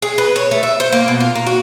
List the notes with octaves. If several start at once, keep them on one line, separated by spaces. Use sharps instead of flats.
G#4
B4
C#5
A3
E5
C5
A#3
B2
F4
A#3
F#4